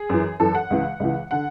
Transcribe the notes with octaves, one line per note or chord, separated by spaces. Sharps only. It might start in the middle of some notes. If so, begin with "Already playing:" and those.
Already playing: G#4
F#2 E3
F#2 E3 A4
F#5
C#2 C#3 E3
C#2 C#3 E3
D3 F#5